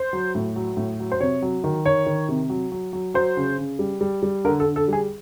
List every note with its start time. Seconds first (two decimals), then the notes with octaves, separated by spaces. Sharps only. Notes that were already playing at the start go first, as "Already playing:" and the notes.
Already playing: C5
0.13 F#3
0.35 A2
0.56 F#3
0.77 A2
1.00 F#3
1.12 C5
1.20 C3 C#5
1.42 F#3
1.64 D#3
1.85 D#3 C#5
2.06 D#3
2.29 C3
2.50 F#3
2.72 F#3
2.93 F#3
3.14 F#3 C5
3.37 C#3
3.58 C#3
3.79 G3
4.01 G3
4.23 G3
4.45 D3 A#4
4.60 A4
4.66 D3
4.76 A4
4.88 G3 G#4